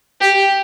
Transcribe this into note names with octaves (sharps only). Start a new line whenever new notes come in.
G4